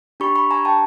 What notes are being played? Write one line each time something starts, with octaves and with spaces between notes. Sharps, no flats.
D4 G4 B5 C#6
B5 C#6
G#5 A#5
G5 A5